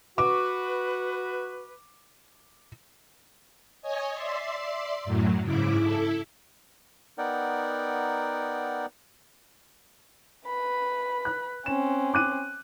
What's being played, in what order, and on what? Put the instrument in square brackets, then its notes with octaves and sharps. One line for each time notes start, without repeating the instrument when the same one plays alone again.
[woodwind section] F#4 B4 [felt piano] D6
[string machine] C#5 D#5 G#5
D5 E5 C6
F#2 A2 F#3
G#2 C#3 E4 D6
E4 A4
[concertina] B3 D#4 A#4 D5 F#5 G5
[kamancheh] B4 B5
[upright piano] F#6
[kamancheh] C4 C#4 [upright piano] E7
[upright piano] D6 F#6 D#7